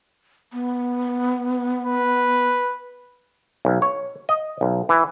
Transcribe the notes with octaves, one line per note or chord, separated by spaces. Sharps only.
B3
B4
B1
C#5
D#5
B1
E3